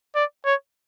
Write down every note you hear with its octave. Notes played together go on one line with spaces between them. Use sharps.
D5
C#5